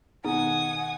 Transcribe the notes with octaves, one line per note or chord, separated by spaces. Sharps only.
B2 D#3 B3 D#4 G#4 F#5 G#5 D#6